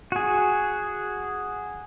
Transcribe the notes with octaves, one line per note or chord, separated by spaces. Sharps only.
F#4 G#4